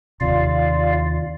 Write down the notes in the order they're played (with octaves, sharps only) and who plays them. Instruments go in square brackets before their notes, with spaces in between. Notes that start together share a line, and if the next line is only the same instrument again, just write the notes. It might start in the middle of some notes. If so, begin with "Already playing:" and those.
[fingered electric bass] D#2 C3 [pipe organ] F4 D5 F5